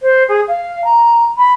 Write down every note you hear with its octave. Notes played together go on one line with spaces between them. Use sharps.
C5
G#4
F5
A#5
B5